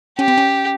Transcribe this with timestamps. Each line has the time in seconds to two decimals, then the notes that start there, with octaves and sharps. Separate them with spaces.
0.19 C#4 G4
0.28 C4
0.38 C#4